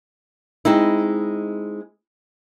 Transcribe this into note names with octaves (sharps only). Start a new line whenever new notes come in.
G#3 C4 D#4 E4